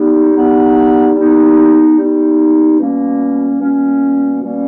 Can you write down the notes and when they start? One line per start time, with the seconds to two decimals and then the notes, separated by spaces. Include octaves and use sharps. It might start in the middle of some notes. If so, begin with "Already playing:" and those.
Already playing: G3 B3 D#4
0.33 G3 B3 D#4
1.15 G3 B3 D#4
1.97 G3 B3 D#4
2.78 B2 G3 A#3 C#4
3.60 B2 G3 A#3 C#4
4.42 B2 G3 A#3 C#4